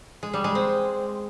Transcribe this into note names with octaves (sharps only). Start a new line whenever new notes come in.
G#3
G3
G#3
C4